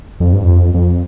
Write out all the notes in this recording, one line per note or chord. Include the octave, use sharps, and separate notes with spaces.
F2
G2
F2
F2